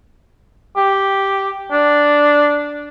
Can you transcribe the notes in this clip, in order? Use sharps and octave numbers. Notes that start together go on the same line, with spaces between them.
G4
D4